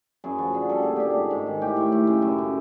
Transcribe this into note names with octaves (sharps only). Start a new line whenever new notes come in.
F#2 G#4
F3 F#4
D3 G#4
G3 A4
A#2 G#4
A#2 G4
G#4
G#2
G#2
D#3
A2 G4
A2
A2
C#3
F#2
C#3